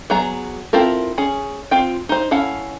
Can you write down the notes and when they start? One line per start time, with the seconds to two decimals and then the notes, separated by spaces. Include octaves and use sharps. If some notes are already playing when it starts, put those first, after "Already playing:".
0.10 F#3 B3 G#4 A#5
0.73 C4 E4 F4 A4 A#4
1.18 C#4 G#4
1.71 C4 F4 G5
2.09 D#4 C5
2.31 C#4 E4 A4 F5 F#5